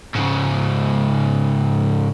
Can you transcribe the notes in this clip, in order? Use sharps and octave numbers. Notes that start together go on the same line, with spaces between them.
G#2 C#3